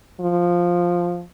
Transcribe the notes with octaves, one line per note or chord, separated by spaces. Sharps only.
F3